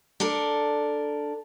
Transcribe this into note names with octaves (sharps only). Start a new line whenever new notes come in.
D4 A4 A#4